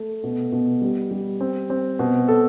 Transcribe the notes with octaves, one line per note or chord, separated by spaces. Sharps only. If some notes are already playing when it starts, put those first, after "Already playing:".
Already playing: A3
B2
B2
G3
G3
C4
C4
B2
A4